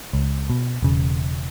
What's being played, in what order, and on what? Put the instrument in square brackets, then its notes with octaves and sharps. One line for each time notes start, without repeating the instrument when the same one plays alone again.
[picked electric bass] C#2
B2
E1 C#3